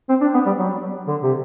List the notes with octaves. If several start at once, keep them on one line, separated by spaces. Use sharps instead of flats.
C4
D4
B3
G3
F#3
D3
C3